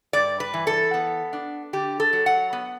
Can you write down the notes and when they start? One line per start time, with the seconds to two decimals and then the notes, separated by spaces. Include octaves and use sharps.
0.13 G2 D5
0.40 B4
0.54 E3
0.67 A4
0.94 B3
1.33 D4
1.73 D3 G4
2.00 A4
2.13 F#3
2.26 F#5
2.53 B3